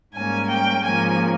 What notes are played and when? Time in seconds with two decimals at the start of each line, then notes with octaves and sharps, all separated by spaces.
0.14 G#2 G3 A#3 C#4 G#5
0.50 G5
0.85 G#2 F3 A#3 C#4 G#5